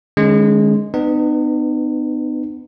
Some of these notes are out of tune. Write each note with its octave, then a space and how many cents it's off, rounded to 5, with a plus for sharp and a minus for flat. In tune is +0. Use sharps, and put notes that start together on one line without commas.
D#3 -45 G#3 +0 C#4 +0
B3 +25 D#4 -45 B4 +0